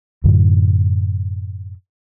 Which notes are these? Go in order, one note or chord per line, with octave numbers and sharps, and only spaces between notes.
F#2 A2 D3 F#3